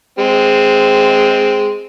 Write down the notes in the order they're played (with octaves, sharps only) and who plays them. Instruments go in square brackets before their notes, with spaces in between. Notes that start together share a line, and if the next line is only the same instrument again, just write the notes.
[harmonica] G#3 C4